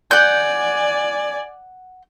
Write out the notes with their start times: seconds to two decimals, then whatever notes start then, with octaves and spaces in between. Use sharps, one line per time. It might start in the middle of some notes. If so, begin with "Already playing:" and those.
0.11 D5 F#5 G#5 G6